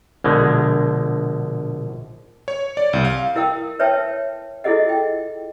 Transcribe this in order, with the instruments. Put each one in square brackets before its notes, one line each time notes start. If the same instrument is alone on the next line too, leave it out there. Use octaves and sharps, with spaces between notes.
[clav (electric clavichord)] A#1 B2 D3 G#3
[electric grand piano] C#5
D5
C2
F5
[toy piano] E4 A#4 F5 G5 D#6
B4 C#5 E5 G5 A5
E4 F4 G#4 A4 D#5 F#5
G5